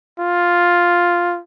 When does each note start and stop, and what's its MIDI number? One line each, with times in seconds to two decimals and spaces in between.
0.19 1.39 65